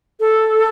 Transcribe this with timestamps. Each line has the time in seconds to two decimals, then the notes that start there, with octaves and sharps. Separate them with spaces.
0.20 A4